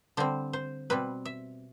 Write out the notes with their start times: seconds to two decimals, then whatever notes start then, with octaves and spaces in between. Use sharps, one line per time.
0.17 D3 G3 C4 C5
0.53 C5
0.90 B2 G3 C4 B4
1.25 E5